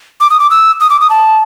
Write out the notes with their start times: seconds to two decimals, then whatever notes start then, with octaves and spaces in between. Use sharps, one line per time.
0.21 D6
0.30 D#6
0.40 D6
0.51 E6
0.80 D#6
0.90 D6
1.01 D#6
1.10 A5